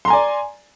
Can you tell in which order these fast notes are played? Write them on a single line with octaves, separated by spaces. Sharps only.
C6 A#5 G#5 D5